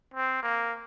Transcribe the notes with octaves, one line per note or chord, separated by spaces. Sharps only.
C4
A#3